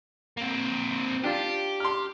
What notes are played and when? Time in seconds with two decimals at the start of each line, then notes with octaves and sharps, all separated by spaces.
0.37 A#3 C4
1.24 D4 F4 G4
1.80 C6 F6